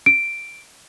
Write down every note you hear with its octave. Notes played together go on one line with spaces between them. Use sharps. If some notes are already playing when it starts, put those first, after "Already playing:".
D7